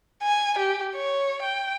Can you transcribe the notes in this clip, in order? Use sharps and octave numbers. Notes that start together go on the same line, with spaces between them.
G#5
G4
C#5
G5